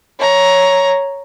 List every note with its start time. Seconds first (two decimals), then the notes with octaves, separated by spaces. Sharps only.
0.19 C#5 A#5